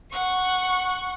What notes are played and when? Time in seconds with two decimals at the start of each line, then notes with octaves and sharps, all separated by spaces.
0.11 F#5 C#6